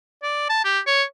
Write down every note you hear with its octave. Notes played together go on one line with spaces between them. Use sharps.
D5
A5
G4
C#5